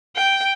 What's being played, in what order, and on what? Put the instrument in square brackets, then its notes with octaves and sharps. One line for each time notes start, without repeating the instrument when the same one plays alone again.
[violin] G5